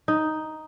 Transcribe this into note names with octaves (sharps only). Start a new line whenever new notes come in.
D#4